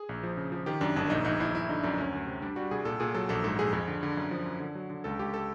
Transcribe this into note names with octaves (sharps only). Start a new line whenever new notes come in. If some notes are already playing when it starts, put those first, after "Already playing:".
Already playing: G#4
A#1
F3
C#3
F3
D#3 G4
F#2 D4
G1 D4
A#1 D#4
A#1 D#4
A#1 E4
G1 E4
D3 D#4
F#2 D4
D2 C#4
D2
C3
G3 D4
G3 F#4
C2 G#4
A#2 A4
A#2 G#4
F#3 A4
A#1 A4
G#2 A4
A#1 G#4
F2 G#4
D3
D3
F#2
F3
F#2
D3
F#3
D3
C#2 A4
C#2 G4
A4